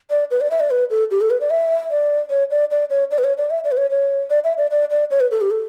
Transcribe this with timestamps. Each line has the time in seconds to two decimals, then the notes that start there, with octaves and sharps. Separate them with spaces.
0.10 D5
0.31 B4
0.41 D5
0.51 E5
0.60 D5
0.71 B4
0.90 A4
1.11 G4
1.21 A4
1.30 B4
1.41 D5
1.50 E5
1.91 D5
2.30 C#5
2.51 D5
2.71 D5
2.90 C#5
3.11 D5
3.18 B4
3.24 C#5
3.38 D5
3.50 E5
3.64 D5
3.72 B4
3.77 C#5
3.90 C#5
4.30 D5
4.44 E5
4.58 D5
4.71 D5
4.91 D5
5.11 C#5
5.20 B4
5.31 A4
5.41 G4
5.51 A4